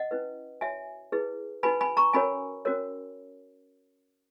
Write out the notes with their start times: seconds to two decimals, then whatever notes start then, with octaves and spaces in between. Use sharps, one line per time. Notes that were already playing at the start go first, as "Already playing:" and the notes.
Already playing: D#5 F#5
0.11 C#4 E4 B4
0.61 F#4 C#5 E5 G#5
1.12 E4 G#4 B4
1.63 D#4 F#4 B4 G#5 B5
1.81 G#5 B5
1.97 A#5 C#6
2.13 C#4 F#4 A#4 C#5 G#5 B5
2.65 C#4 F#4 A#4 C#5